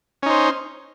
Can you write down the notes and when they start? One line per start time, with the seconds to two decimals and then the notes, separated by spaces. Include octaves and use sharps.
0.23 C#4
0.26 D#4
0.30 C5